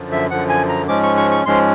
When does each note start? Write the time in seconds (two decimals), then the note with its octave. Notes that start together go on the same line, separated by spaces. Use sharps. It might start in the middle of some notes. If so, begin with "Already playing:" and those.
Already playing: F#2 D3 F3
0.12 E5
0.31 F#2 D3 F3 F#5
0.49 G#5
0.69 A#5
0.88 G#2 F3 G#3 C#4 D6
1.03 C#6
1.17 C#6
1.31 C#6
1.46 G#2 F3 G#3 C#4 C6